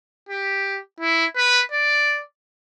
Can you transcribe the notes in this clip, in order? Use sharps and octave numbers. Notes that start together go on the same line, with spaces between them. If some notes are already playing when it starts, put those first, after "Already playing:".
G4
E4
B4
D5